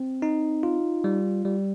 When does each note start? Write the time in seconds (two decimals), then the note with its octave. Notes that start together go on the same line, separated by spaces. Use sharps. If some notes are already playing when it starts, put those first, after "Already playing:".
Already playing: C4
0.22 D#4
0.63 F4
1.04 G3
1.45 G3